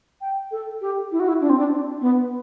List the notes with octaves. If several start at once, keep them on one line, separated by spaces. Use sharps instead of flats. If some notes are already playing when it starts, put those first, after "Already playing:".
G5
A4
G4
E4
F#4
E4
D4
C4
D4
B3